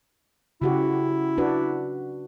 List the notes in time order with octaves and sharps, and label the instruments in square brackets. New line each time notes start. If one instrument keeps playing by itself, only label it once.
[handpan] C#3 F#4 G4 [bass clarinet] E4
[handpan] D4 F#4 B4